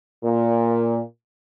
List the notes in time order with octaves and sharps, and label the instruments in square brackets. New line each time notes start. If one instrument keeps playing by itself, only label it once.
[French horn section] A#2